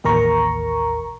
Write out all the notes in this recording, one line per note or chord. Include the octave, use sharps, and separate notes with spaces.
A1 D#2 A#4 A#5 C#6